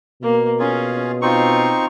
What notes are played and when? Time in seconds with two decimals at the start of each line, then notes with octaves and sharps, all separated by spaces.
0.23 B2 A#3
0.60 C#4 F4 G#4
1.22 C4 D#4 F4 C#6